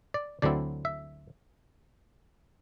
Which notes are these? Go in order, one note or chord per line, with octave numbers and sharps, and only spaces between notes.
D5
D2 D3 F#3 C4 E4 D5
E5